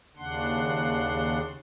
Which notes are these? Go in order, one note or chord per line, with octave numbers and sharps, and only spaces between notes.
D#2 C#3 D4 F#5 C6